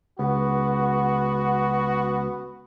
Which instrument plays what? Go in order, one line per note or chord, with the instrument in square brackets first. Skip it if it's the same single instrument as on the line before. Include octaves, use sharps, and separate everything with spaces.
[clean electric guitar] C#2 [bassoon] B3 [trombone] F#4